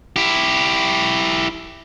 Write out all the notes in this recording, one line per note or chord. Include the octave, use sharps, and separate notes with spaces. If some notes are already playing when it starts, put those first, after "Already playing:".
E4 G4